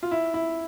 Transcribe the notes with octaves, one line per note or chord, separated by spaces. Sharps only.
F4
E4
E4